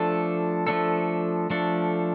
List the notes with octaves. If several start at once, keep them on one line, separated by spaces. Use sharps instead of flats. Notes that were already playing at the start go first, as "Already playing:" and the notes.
Already playing: F3 A3 D4 A4
F3 A3 D4 A4
F3 A3 D4 A4